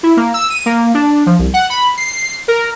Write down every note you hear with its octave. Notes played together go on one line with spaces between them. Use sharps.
E4
A#3
E6
D#7
A#3
D4
F3
C2
F#5
B5
C7
A#4